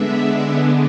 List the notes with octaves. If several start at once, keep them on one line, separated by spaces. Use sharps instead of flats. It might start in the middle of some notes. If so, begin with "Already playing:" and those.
Already playing: D3 G#3 B3 D4 E5